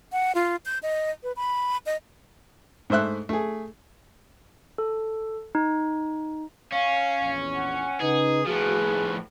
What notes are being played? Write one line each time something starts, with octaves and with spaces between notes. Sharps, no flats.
F#5
F4
G6
D#5
B4
B5
D#5
G#2 A3 C5 E5 F#6
A3 G#4
A4
D#4
C#4 F5
A#1 E2
F#5
C#3 D#4 G#4 B4
A2 F3 F#4 G#4 B4
A3 D#4